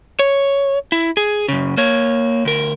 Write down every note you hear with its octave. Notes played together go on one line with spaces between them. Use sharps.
C#5
E4
G#4
F#2 C#3
A#3 C#5
D2 A#4